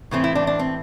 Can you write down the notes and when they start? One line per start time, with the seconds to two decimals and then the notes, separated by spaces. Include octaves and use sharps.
0.11 A2 E3 A3 C4
0.24 E4
0.35 D4
0.47 D4
0.59 C4